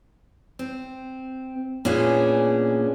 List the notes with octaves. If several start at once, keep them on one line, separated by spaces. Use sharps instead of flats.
C4
A#2 B3 C#4 D4 G#4